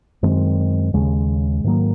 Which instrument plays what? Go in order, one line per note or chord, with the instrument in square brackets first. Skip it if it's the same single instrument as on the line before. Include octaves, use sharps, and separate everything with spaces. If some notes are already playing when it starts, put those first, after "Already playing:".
[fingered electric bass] F#2 D#3 G#3 C4
D#2 C#3 G#3
G#2 D#3 F#3 A#3